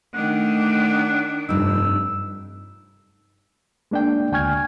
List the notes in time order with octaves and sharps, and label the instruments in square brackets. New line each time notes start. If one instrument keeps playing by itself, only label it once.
[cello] D#3 D4 [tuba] A3 [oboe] F#5
[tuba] F1 [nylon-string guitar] G2 D#4 [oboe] E6
[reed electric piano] G#3 A#3 D4 D5 G5
D2 G5 G#5 C#6 F6 G#6